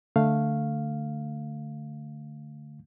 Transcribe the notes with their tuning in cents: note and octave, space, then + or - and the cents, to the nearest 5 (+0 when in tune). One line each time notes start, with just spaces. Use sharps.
D3 +0 A3 +5 F5 +0